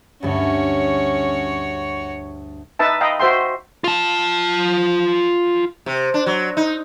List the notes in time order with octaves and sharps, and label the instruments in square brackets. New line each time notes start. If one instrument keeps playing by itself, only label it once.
[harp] D2 G2 [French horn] C#4 [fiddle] F#4 C#5
[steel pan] D#4 B4 E5 A5
D#5 F5 G5 A#5 B5
F#4 C5 E5 G5 C6
[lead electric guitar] F4 A5
[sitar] C3
D4
F#3
D#4